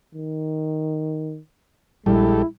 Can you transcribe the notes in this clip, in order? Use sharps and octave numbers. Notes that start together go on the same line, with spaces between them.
D#3
A#1 G3 G#3 E4 G4 A4